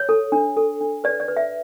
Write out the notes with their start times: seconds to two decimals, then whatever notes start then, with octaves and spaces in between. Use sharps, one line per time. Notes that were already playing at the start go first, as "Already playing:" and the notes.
Already playing: C#5
0.09 A4
0.32 D4
0.57 A4
0.81 D4
1.04 B4 D5
1.20 D5
1.28 B4
1.37 E5